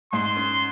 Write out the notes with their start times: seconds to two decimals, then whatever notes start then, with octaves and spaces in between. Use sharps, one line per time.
0.13 G#2 C6
0.36 C#4